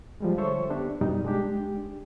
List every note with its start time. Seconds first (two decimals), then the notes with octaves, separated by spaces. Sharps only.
0.20 F3 G3 G#3
0.38 D3 A4 C5 C#5 E5 C#6
0.70 B3 D4 G4
1.01 F#2 B2 G3 D#4
1.25 G#3 D4 G4